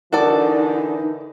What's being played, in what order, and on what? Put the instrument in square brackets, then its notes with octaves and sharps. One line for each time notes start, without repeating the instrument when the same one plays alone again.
[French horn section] D3 E3 [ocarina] D#4 [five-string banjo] F#4 A4 D5 [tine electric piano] A#4